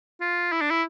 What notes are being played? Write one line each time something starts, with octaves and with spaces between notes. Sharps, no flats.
F4
E4
D4
E4